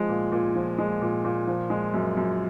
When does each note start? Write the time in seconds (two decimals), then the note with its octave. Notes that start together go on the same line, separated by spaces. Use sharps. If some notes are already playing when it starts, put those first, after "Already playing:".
Already playing: F3 G#3
0.09 A#2
0.32 A#2
0.55 F3
0.78 G#3
1.01 A#2
1.24 A#2
1.47 F3
1.70 G#3
1.94 F#2
2.17 F#2